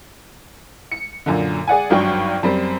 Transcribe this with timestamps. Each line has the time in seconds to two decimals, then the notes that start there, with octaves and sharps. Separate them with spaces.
0.92 C#7
1.26 F#2 A#2 D3
1.68 G#4 D5 F#5 G#5
1.90 G#1 G2 F#3 G5 C#6
2.43 F#2 G3 C4